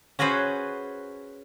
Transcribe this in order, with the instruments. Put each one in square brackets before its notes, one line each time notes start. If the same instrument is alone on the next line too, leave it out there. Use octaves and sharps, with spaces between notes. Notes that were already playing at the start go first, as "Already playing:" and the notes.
[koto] C#4 F#4 G#4 B4 C5